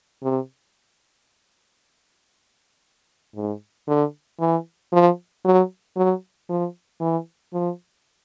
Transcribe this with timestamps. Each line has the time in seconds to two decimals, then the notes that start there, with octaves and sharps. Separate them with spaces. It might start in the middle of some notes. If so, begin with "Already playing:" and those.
0.23 C3
3.36 G#2
3.88 D3
4.40 E3
4.93 F3
5.45 F#3
5.96 F#3
6.49 F3
7.01 E3
7.53 F3